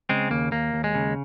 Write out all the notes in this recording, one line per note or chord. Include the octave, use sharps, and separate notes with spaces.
C#3 G#3 C4
D#2 A#3
D#2 A#3
D#2
G#3
C#3